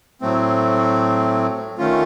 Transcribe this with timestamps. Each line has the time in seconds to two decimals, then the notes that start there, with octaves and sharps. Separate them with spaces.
0.21 A2 F#3 A3 C4
1.78 D#3 A3 C#4 F4